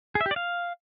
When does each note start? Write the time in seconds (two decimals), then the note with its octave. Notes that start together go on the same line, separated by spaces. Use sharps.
0.15 G#4
0.21 E5
0.26 G4
0.31 D5
0.36 F5